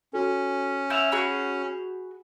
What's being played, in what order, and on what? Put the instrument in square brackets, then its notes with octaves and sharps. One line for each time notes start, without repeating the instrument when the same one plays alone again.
[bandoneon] C#4 [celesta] F#4 A4
[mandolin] E4 F#5 [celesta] G6 E7 F7
[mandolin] F#4 G#4 B5